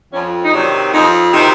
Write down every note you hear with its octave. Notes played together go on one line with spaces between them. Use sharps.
F2 C#4
D#4
C3 D#3 F#3 D4
F2 D#4
C3 D#3 F#3 D#4